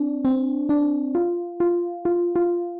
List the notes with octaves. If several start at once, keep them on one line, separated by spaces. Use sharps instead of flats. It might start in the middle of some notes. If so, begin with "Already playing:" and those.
Already playing: C4 D4
C4
D4
F4
F4
F4
F4